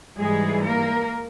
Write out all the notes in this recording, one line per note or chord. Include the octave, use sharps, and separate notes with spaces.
G#2 E3 G3 G#3 G#4
A#3 A#4